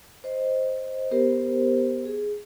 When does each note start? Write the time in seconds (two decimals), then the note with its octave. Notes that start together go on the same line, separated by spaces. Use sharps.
0.24 C5 D#5
1.11 B3 G4 A#4 C5
2.05 G#4